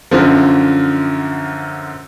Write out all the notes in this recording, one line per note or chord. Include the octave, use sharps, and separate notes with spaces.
F#2 D3 F3